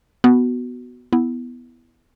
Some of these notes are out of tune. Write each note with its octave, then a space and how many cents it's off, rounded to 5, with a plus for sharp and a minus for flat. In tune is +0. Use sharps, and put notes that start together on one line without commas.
B3 +0 F#4 +5
B3 +0 E4 +0